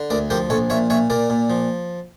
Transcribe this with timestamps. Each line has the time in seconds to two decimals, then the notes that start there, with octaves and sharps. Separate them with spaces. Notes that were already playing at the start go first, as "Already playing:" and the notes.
Already playing: D3
0.10 D2 A#4 D5
0.30 F3 G4 A#4
0.50 A#1 A4 C#5
0.70 A#2 C#5 E5
0.90 A#2 C#5 E5
1.10 A#2 A#4 D5
1.30 A#2
1.50 F3